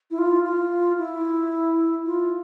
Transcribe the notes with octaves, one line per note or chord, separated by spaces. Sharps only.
E4
F4
F4
E4
F4